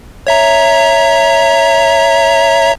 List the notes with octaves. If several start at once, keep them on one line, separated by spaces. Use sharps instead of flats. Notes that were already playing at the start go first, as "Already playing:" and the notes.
C#5 E5 A#5